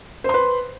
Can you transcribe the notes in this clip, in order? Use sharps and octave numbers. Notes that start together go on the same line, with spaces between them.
B4 C5 C6